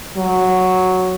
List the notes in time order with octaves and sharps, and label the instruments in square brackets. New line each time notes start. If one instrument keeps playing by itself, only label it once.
[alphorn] F#3